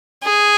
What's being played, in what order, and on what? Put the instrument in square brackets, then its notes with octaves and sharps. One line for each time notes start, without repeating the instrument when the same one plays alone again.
[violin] G#4